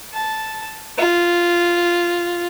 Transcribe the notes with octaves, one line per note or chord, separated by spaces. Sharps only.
A5
F4